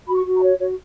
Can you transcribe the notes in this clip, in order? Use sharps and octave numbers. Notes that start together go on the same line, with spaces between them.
F#4 B5
C#6
F#4
A#5
C#5
F#4 C#5